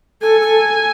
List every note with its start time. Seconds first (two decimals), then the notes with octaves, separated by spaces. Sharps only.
0.22 A4 G#5
0.41 A4